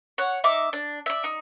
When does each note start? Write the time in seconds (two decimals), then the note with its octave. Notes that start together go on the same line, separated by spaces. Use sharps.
0.18 C#5 F#5
0.44 D#4 E5 D6
0.73 D4
1.06 D5 E5
1.24 D#4